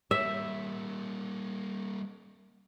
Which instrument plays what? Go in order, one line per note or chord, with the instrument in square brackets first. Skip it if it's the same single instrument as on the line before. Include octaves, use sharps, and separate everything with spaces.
[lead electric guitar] G3 A#3 [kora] E5